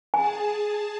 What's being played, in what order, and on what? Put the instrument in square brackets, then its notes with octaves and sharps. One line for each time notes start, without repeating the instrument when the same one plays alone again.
[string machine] G#4 A5 [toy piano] G#5